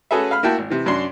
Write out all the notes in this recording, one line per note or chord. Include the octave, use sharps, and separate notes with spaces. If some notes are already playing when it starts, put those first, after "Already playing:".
C#4 F#4 G#4 A4 B4 E5
F5 B5 F6
A#3 E4 F#4 G5 A5
G#1
C3 E3
F#2 D4 F#4 C6